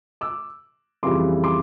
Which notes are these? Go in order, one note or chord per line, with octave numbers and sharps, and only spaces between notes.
D6 E6
F2 C#3 E3 G3 C6 D6
C6 D6